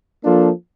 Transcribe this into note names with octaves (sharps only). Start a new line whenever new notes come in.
F3 A#3 D4 F4 A4